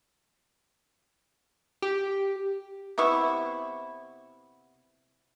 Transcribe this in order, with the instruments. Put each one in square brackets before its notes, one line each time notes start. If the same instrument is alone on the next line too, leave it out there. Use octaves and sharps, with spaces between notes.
[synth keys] G4
[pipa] C3 B3 E4 C#6